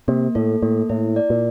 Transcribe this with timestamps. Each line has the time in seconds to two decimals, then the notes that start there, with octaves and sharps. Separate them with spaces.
0.08 C3 A#3
0.35 A2 A4
0.62 A2 A#3
0.89 A2 E4
1.16 D5
1.30 A#2